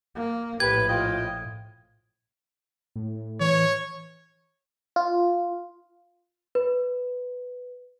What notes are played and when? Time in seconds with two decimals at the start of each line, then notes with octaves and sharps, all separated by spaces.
0.15 A#3
0.60 A#1 A2 G4 B4 G#6
0.89 F4 D#5 G5
2.96 A2
3.41 E3 C#5
4.96 F4
6.55 B4